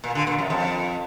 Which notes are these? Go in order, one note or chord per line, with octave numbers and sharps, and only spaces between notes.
A#2
D3
A#2
F#2
F2